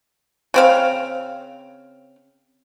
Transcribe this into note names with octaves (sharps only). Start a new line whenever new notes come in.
C#3 C4 F5